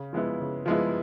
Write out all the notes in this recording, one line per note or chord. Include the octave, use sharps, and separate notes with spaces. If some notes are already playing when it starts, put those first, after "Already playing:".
Already playing: C#3
F3 G#3 B3 E4
C#3
F3 G#3 B3 E4